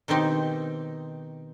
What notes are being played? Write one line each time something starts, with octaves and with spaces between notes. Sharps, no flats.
B2 D#3 C4 D#4 G4